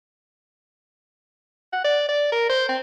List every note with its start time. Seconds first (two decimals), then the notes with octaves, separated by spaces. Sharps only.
1.73 F#5
1.84 D5
2.09 D5
2.32 A#4
2.49 C5
2.69 C4